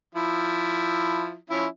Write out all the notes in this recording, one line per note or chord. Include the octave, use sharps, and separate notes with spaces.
F3 E4
F3 C#4 E4